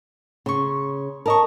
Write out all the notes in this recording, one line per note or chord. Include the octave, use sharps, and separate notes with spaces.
C#3 C6 C#6
A#4 D#5 A5 C#6